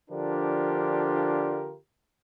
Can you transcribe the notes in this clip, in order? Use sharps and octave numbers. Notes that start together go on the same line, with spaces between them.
D3 F3 D4 F4 G4 A#4